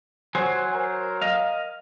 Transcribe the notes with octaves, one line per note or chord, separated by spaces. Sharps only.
F#3 C5 G#5
A#4
D#5 F5